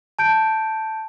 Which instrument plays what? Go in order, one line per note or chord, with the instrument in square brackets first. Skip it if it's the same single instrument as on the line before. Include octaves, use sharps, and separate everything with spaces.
[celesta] A5 G6 D7